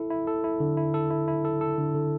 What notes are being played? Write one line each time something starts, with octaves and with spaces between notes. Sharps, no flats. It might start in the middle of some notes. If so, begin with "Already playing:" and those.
Already playing: E4 A4
E4
A4
E4
D3
E4
A4
E4
E4
A4
A4
D3
D3